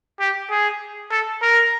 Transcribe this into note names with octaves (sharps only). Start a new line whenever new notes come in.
G4
G#4
A4
A#4